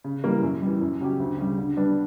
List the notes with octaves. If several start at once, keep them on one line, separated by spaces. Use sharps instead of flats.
C#3
E3 G3 A#3
F#2
E3 G3
F#2
C#3 F#3 C#4 G4
D2
C#3 G3
D3
G3 B3 D4